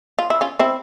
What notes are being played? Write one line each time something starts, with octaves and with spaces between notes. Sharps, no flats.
F4
E4
C#4 F4
C4 E4